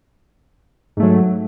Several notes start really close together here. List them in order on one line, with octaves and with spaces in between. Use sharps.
G#2 A3 F#3